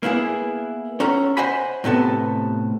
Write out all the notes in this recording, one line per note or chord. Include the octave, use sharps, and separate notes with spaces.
A#3 B3 E4 G#4
C#4 A4 C#5 F#5 A#5
C5 D#5 F#5 G#5 B5
A2 C3 B3 A4